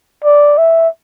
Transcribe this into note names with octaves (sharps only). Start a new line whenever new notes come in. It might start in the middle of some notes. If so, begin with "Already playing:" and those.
D5
E5